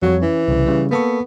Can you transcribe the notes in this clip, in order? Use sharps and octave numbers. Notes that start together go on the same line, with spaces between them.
F2 F#3 G3 C#5
E3 C#4
C2 C#3
C#3 G3
A#3 B3 A4 C#6